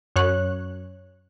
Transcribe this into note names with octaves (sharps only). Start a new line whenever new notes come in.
F#2 C#5 F#6